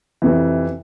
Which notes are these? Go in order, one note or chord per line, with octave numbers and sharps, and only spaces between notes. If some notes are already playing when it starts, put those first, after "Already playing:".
F2 C3 E3